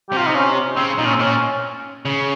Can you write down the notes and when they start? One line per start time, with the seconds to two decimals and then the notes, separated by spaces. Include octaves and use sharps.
0.09 G4
0.13 C3 F4
0.26 D#4
0.35 C#4
0.76 C#3 C4
0.98 A#2 D#4
1.06 C#4
1.14 C4
1.20 A#2 C#4
2.05 C#3